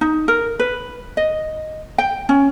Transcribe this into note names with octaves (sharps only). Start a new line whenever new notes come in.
D#4
A#4
B4
D#5
G5
C#4